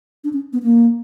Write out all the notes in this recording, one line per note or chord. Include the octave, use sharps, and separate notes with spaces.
D4
C#4
B3
A#3